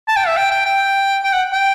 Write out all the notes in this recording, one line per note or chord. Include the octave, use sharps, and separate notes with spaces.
A5
G5
E5
G5
G5
G5
G5
F#5
G5